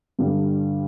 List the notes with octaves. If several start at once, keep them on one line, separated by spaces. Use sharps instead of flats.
G2 D3 G3